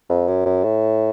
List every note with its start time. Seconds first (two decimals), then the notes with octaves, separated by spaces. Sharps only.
0.09 F2
0.28 F#2
0.46 F#2
0.64 A2